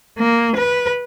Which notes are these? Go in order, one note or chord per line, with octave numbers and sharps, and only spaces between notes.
A#3
B4